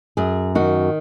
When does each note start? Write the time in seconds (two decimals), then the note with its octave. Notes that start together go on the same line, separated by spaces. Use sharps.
0.17 F#2 G#4
0.55 D#3 F#4